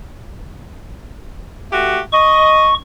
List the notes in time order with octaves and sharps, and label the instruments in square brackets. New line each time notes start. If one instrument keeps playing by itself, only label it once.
[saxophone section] A3 F#4 G4
[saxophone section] D#5 [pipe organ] C#6